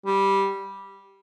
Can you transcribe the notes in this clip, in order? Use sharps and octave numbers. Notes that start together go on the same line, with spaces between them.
G3